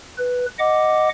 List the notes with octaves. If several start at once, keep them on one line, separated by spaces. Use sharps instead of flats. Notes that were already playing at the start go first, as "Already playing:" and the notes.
B4
D#5 F#5 D6